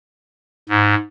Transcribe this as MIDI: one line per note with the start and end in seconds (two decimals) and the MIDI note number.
0.69 0.94 44